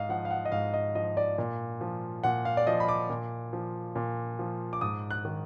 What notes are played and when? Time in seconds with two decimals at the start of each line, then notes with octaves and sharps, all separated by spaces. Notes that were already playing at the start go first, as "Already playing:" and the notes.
Already playing: G#2 D#5 F5
0.09 F3 F#5
0.25 F5
0.31 F#5
0.45 D#5
0.52 G#2 F5
0.74 D#5
0.95 F3 D#5
1.17 D5
1.38 A#2
1.81 F3
2.23 A#2 F#5
2.45 F5
2.57 D5
2.67 F3 D#5
2.80 B5
2.89 D6
3.10 A#2
3.53 F3
3.96 A#2
4.39 F3
4.73 D6
4.81 G#2 D#6
5.11 F#6
5.25 D#3